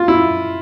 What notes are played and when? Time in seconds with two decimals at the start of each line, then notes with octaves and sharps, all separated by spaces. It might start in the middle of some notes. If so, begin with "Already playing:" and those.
Already playing: F4
0.08 E4